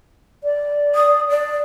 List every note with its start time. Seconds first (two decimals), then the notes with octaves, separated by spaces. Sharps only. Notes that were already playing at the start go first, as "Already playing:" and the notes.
0.44 D5
0.95 D#6
1.30 D5